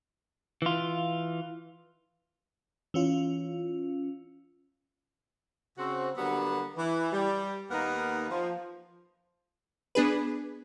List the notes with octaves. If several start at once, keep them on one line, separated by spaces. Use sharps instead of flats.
E3 F4
E3 C#4 F4
C#3 C4 F#4
D3 F#3 G3 A#3 B3
E3
G3
D#2 A#3 B3 D#4 A#4 F#5
F3
B3 D4 G#4 B4